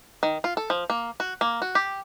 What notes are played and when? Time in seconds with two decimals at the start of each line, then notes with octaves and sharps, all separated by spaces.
0.23 D#3
0.44 F4
0.57 A4
0.70 F3
0.90 A#3
1.20 F#4
1.41 A#3
1.62 F#4
1.75 G4